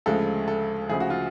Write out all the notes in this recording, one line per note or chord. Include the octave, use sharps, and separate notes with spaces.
D2 C#3 F3 G#3 A4
A4
D2 C#3 F3 G#4
F#4
F4